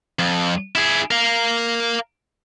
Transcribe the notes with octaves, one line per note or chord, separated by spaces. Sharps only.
F2
E4 G#4
A#4 F5